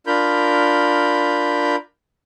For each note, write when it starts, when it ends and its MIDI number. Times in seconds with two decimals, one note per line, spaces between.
0.07 1.76 62
0.07 1.76 65
0.07 1.76 70
0.07 1.76 83
0.07 1.76 91